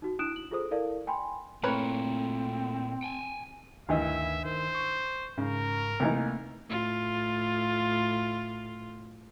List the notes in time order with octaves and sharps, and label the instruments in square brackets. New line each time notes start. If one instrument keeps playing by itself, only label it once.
[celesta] D#4 F#4
D4 E4 D#6 F#6 D7 E7
F#7
F4 G#4 A4 C5 D#6
E4 A4 A#4 D5 F5
G5 G#5 B5 C6
[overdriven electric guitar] A#2 E4 [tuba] A3 [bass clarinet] C4 [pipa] A#4 B4 C#5
[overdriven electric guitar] G5 G#5
[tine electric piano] D2 D#3 [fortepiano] G2 E3 D#5 [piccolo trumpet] E5
[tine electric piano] D#3 [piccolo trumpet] C5
[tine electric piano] C#6
[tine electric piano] G#2 [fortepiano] C#3 [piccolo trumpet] A#4
[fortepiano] C2 E3 D#4 [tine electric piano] A3 A#3
[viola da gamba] A2 F4